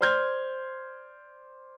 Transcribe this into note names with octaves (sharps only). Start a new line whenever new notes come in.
C5 D5 C6 F6 G6 G#6